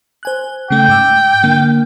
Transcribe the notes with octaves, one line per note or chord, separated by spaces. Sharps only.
C5 G#5 F#6
C#3 A3 G5
G#2 D6 E6
D3 A#3